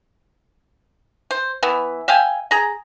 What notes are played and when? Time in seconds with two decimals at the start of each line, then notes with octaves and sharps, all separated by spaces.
1.31 C5
1.63 E3 B3 E4
2.08 E5 F5 G5 G#5
2.51 G#4 A#5